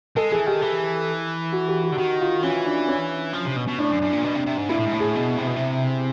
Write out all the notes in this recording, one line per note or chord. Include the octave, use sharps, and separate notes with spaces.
G#3 A4
E3 G#4
D#3 G4
E3
F#4
G4
F#4
D3
D#3 F#4
F4
E3 C#4
D4
C#4
F3
C3
B2
B2
A2 D4
F#2
F#2
A#2
B2
C3
C3
G#2
A#2 E4
A2
G#2
A2
G#4
B2
C3
B2
C3